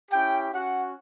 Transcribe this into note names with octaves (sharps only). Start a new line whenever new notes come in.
C#4 E4 G4 G5
C#4 F#4 F#5